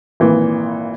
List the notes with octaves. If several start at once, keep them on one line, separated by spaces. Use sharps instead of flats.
G#1 A#2 E3